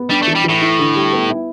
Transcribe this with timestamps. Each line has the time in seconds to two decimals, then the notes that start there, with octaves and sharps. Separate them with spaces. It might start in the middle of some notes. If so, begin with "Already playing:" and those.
Already playing: B3
0.10 G3 D4
0.22 A3
0.27 E3
0.35 G3
0.44 A2 E3
0.61 E4
0.79 D3
0.95 G3
1.12 B3
1.30 E4